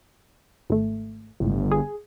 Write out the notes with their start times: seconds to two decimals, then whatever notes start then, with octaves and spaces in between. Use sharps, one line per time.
0.70 G#1 A3
1.40 G1 C#2 A2
1.71 G#4